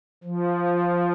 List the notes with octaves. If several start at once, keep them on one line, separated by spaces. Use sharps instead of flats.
F3